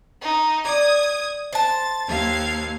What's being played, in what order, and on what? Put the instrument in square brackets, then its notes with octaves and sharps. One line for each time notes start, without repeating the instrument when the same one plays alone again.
[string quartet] D#4
[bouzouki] D5 [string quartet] D#6 G#6
[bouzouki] C5 A5 [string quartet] A6
[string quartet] D#2 F5 G#6